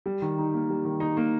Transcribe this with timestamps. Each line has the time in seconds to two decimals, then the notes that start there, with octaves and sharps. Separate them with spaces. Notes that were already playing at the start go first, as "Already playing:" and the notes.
0.06 G3
0.22 D#3
0.38 D#4
0.54 A#3
0.70 G3
0.85 D#3
1.00 D#4
1.17 A#3